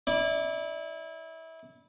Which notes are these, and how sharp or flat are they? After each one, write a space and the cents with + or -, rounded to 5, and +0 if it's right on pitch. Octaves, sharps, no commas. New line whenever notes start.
E4 -25 D5 +5